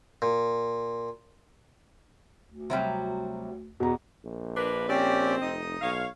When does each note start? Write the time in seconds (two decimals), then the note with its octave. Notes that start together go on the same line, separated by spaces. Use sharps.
0.22 A#2
2.50 D2
2.70 C3 F#3 G3
3.80 E2 B2 A#5
4.25 A#1
4.57 A#3 D4 B4
4.89 C4 C#4 G4 D5
5.42 F1 D#4 D#5 D#6
5.82 B1 C#5 F5